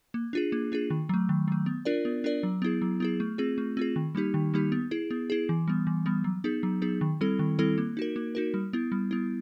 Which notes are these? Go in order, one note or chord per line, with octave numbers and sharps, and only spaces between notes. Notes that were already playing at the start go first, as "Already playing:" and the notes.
A#3
D4 F4 G#4
A#3
D4 F4 G#4
D#3
F#3 A3
D#3
F#3 A3
B3
D4 F4 A#4 D5
B3
D4 F4 A#4 D5
F#3
B3 E4 G#4
F#3
B3 E4 G#4
A3
C4 F4 G#4
A3
C4 F4 G#4
D#3
G3 A#3 D#4 G4
D#3
G3 A#3 D#4 G4
B3
E4 G#4
B3
E4 G#4
E3
G3 B3
E3
G3 B3
F#3
B3 D#4 G#4
F#3
B3 D#4 G#4
D#3
G3 C4 E4 A4
D#3
G3 C4 E4 A4
A#3
D#4 F#4 A#4
A#3
D#4 F#4 A#4
G3
B3 E4
G3
B3 E4